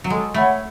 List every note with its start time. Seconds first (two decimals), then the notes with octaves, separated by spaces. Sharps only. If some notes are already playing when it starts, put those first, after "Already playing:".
0.04 F#3
0.10 G#3 A4
0.34 A3 C#5 F#5 B5